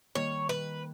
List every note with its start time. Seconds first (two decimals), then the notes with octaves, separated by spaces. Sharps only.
0.15 D#3 G3 A#3 C#5
0.49 B4